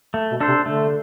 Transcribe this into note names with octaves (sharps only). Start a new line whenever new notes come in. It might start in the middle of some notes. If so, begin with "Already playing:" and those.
A3
B2
D4 A4 C5
C3
D3 A3